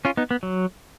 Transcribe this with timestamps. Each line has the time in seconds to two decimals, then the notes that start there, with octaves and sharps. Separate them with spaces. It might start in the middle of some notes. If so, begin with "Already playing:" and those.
0.05 C#4 F4
0.17 B3 D#4
0.31 B3
0.43 F#3